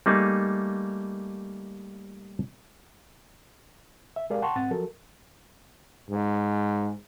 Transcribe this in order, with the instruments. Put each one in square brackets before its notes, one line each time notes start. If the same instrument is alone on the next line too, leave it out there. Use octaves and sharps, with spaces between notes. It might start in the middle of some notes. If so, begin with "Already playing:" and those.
[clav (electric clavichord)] G3 A3 A#3 D#4 G#4
[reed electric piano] E5
G#3 G4 G#4 A#4 D5 F5
F#5 G5 A5 C6 C#6
G#2 C4 F#5 A6
F3 F#3 F#4 A4 A#4
[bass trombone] G#2